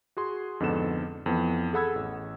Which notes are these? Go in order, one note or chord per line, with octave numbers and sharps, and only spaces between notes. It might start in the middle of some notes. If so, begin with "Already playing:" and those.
F#4 G#4 C6
F2 G#2 D3 B3 A4 E7
F2 E3 B3
G#4 A4 F#5 B5 E6 G#6
A1